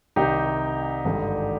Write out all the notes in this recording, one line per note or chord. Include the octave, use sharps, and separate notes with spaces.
C2 C3 D#3 D#4 G4
G#1 G2 D3